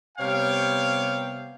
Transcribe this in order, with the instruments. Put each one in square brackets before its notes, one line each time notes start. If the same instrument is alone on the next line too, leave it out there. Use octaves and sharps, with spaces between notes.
[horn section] C3 G3 B3 C#5 F5 G5